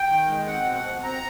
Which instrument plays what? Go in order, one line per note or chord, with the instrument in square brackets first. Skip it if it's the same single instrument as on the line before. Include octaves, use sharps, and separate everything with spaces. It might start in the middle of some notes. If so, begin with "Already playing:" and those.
Already playing: [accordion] G5
D#3
G#3
C4 F#5
B2
F#5
C4
C4 A#5